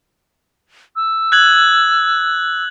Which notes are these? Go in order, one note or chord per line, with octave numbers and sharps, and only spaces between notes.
E6
F#6 G#6 F#7